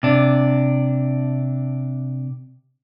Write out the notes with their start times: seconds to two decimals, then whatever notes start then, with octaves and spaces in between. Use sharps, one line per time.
0.03 C3 D4